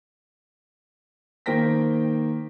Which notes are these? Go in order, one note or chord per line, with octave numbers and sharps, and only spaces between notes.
D#3 A#3 C5 G5 A#6 B6